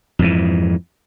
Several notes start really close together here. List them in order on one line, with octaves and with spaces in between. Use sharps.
F2 G#2 E3